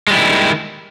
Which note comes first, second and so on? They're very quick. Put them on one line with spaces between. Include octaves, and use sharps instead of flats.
G#3 G3 E4 D#3